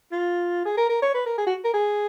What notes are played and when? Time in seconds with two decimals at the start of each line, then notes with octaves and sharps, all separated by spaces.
0.12 F4
0.65 G#4
0.77 A#4
0.90 A#4
1.02 C#5
1.14 B4
1.26 A#4
1.38 G#4
1.47 F#4
1.64 A#4
1.74 G#4